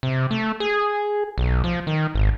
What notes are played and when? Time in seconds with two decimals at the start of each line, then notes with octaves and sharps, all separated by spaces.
0.03 C3
0.31 A3
0.60 G#4
1.38 B1
1.64 F3
1.87 D#3
2.15 G#1